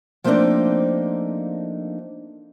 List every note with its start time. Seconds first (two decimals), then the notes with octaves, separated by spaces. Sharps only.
0.24 F3 A3 A#3 C4 D4 D#4